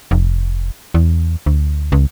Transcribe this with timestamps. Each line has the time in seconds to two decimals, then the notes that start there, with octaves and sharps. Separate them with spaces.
0.11 F1
0.94 E2
1.46 D2
1.92 C#2